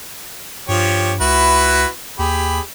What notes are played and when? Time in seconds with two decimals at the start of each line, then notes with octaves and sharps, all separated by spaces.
0.68 G2 F3 G4 C#5
1.20 C#2 E4 F#4 B4
2.19 D#2 G4 G#4 B5